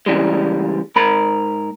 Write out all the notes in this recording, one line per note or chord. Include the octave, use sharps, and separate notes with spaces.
C#3 E3 G3 G#3
G#2 A#4 B5